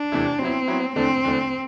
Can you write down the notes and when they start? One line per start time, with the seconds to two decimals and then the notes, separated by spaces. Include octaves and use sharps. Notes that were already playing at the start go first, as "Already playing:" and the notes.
Already playing: D4
0.12 E2 C3 E3 A3 E4
0.39 F#3 B3 C4 E4
0.67 F#3 B3 E4
0.96 E2 D3 A3 C4 D4
1.24 E2 D3 A3 D4